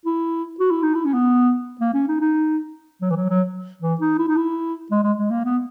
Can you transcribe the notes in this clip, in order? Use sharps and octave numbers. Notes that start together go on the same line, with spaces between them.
E4
F#4
E4
D#4
E4
C#4
B3
A#3
C#4
D#4
D#4
F#3
E3
F#3
F#3
E3
D#4
E4
D#4
E4
G#3
G#3
G#3
A#3
B3